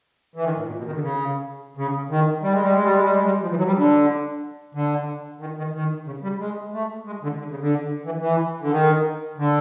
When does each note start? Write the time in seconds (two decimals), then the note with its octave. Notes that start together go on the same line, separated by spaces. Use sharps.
0.36 E3
0.45 D#3
0.56 A2
0.67 A#2
0.78 B2
0.86 D#3
0.95 D3
1.02 C#3
1.77 C#3
2.10 D#3
2.43 G3
2.53 G#3
2.63 G3
2.74 G#3
2.84 G3
2.94 G#3
3.04 G3
3.14 G#3
3.25 G3
3.42 F3
3.50 E3
3.58 F#3
3.67 G3
3.76 D3
4.75 D3
5.41 D#3
5.58 D#3
5.74 D#3
6.07 C#3
6.23 G3
6.40 G#3
6.73 A3
7.07 G#3
7.23 D3
7.39 D3
7.51 C#3
7.61 D3
8.05 E3
8.21 E3
8.62 D3
8.71 D#3
9.38 D3